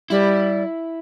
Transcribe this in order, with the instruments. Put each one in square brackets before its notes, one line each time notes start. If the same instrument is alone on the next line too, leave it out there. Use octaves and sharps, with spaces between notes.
[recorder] G3 [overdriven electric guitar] E4